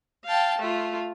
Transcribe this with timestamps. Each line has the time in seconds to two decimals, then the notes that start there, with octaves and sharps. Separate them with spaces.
0.25 F5 G5 A5
0.58 A3 F4